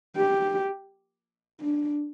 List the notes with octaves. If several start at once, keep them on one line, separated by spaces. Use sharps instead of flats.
G4
D4